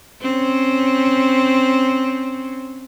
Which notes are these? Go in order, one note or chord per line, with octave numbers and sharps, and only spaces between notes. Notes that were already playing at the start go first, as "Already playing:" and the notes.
C4 C#4